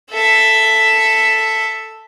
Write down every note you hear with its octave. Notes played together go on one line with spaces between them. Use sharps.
A4 E5